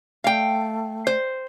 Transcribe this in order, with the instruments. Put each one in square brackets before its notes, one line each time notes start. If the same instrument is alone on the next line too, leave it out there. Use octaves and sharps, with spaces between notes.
[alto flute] A3 [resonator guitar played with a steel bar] F5 G5
[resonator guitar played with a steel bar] C5